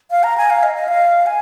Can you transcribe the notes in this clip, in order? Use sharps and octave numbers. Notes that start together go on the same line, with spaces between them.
F5
A#5
G#5
F5
D#5
D#5
F5
G#5